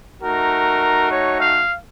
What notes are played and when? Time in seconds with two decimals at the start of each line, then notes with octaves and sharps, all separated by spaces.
0.22 A3 D#4 F#4 A#4
1.11 C#5
1.40 F5